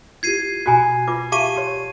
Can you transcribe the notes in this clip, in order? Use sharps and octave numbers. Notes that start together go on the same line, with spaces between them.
E4 F4 G4 G#6 C7 D#7
B2 F#4 G#5 A#5 B5 F#6
F4 B4 D6
G4 E5 F5 A5 C#6 D6 D#7
G4 C#5 C6